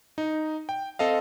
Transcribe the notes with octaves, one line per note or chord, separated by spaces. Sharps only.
D#4
G5
C4 A4 D#5 F5